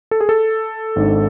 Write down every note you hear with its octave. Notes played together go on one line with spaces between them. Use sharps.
A4
G#4
A4
G#1 G#2 G#3 D4